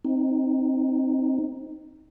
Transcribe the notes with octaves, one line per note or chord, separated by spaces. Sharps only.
C4 D#4